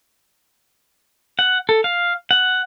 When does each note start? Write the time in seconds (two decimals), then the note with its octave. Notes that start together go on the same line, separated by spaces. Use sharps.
1.39 F#5
1.69 A4
1.84 F5
2.31 F#5